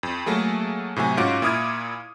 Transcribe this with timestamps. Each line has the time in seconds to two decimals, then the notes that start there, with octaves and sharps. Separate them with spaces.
0.03 F2
0.26 F#3 A3 A#3 G#4
0.96 A2 C3 F#3 G#5
1.17 G#2 C#4 F4 F#4 D6 D7
1.42 A#2 E4 D#6 F6 G#6